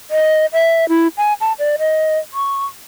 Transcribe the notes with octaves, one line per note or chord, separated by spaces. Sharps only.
D#5
E5
E4
G#5
A5
D5
D#5
C#6